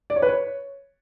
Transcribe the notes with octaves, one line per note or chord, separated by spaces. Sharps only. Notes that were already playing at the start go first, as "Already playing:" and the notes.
D5
C#5
B4
C#5